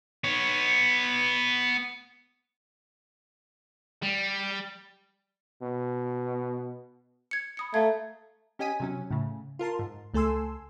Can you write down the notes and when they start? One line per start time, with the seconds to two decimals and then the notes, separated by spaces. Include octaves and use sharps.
0.24 B3 C#5
4.02 G3
5.62 B2
7.31 G#6 C#7
7.57 B5 D#6 C#7
7.74 A3 F5 A#5 G#6
8.59 C#4 G4 D#5 G#5 B6 D#7
8.80 C3 F#3 C#4
9.11 A2 C#3
9.59 F4 A#4 A5 C6
9.79 G#2
10.13 C#2 A3 A4 G#5 C6 E6